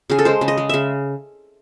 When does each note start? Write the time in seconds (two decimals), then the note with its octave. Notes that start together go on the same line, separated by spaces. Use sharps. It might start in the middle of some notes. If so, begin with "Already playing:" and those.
0.10 C#3 G#4
0.19 A4
0.25 G#3 C5
0.41 C#3
0.48 D#5
0.58 G#3
0.69 C#3 E5